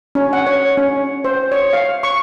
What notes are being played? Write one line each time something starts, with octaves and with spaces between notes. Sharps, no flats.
C#4
F#5
C#5
C#4
C5
C#5
F5
C#6